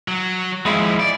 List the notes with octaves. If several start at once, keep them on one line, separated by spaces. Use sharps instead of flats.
F#3
D#2 F3 G#3 E4
D5